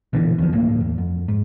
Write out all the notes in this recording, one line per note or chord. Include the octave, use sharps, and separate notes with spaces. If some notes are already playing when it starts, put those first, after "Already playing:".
A#1 B2 D3 E3
E2 D#3 F3
D1 G1 A2 A#3
E2
F2
G#2